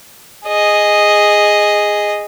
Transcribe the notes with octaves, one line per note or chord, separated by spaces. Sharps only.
G#4 D#5